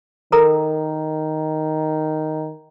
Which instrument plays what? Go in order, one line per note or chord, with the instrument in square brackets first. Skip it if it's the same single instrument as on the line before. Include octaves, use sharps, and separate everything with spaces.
[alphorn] D#3 [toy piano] A4 A#4 A#5